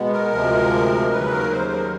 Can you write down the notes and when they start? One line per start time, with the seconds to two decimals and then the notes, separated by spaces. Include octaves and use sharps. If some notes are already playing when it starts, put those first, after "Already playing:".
Already playing: B2 G#3 B3
0.13 A#4
0.33 D2 C3 F3 G#3
1.12 D#2 C#3 F#3 B4
1.32 A#4
1.52 C5
1.71 A#4